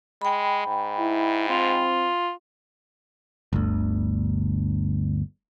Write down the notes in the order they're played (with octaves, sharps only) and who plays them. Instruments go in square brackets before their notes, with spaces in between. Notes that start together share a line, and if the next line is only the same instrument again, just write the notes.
[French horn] G#3 [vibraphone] G5 B5
[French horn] G#2
[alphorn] E4
[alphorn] C4 [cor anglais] F4
[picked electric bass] G1 D2